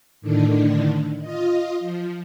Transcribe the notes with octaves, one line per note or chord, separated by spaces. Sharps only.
A2 D3 D#3 D4
F4 D#5
F3